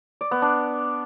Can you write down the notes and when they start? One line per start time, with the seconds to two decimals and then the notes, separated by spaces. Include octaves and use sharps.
0.21 D5
0.31 B3
0.42 D4